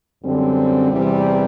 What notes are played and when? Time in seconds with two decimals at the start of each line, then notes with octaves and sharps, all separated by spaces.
0.23 F#2 D3 G3 C4
0.91 E2 C3 E3 G3